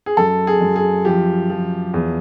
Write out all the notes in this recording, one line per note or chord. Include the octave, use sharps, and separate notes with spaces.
G#4
F#2 A4
G#4
F#2
G#4
F3 G4
F3
E2